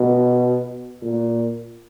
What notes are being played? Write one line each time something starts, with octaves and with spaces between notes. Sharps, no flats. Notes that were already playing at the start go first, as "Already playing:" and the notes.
Already playing: B2
A#2